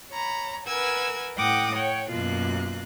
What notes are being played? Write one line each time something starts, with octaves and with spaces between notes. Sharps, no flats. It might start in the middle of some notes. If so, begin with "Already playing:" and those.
C#5 A#5 B5
A#4 B4 F#5 G#5 E6 G#6
A2 F#5 G5 D6 D#6 A#6
C#5 F#5 G5
F#2 B2 A#3 F4 F#6